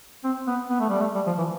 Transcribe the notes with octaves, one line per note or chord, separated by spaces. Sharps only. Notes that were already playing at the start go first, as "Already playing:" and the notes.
C4
B3
B3
A3
G3
A3
G3
F3
E3